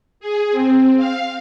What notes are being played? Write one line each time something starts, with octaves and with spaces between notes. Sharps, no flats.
G#4
C4
F5